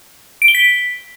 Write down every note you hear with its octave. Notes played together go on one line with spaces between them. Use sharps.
D7
G7
B6